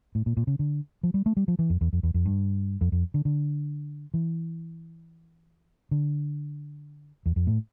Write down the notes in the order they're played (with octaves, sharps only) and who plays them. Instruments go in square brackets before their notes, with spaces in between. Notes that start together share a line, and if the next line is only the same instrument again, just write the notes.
[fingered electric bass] A2
A#2
A#2
C#3
D3
F3
G3
A3
G3
F3
E3
F2
E2
F2
E2
F2
G2
F2
F2
D3
D3
E3
D3
E2
F2
A2